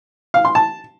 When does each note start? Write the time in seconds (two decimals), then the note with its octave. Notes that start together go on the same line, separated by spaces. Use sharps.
0.34 F5
0.45 C6
0.55 A5